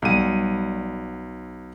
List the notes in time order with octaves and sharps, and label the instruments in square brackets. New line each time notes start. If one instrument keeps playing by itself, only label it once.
[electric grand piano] B1 D#7 [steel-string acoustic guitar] G3 F#5